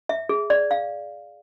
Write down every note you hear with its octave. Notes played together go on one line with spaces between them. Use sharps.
E5
G#4
D5
F5